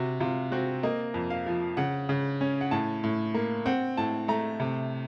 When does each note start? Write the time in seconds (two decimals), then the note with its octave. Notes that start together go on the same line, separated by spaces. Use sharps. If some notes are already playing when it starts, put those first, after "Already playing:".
Already playing: C3 F#4
0.20 C3 F4
0.52 C4 F#4
0.83 A#3 D#5
1.14 F2
1.30 F5
1.46 F3
1.77 C#3 F#5
2.09 C#3
2.41 C#4
2.61 F#5
2.71 A2 A5
3.04 A2
3.34 A#3
3.65 C4 F#5
3.97 A2 A5
4.28 A3 A#5
4.60 C3